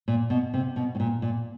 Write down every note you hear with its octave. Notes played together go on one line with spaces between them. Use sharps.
A#2
B2
C3
B2
A2
A#2
A#2